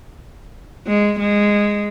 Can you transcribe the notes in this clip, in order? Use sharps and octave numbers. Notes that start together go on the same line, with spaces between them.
G#3
G#3